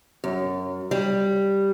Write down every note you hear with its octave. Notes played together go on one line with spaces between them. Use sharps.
F#2
G3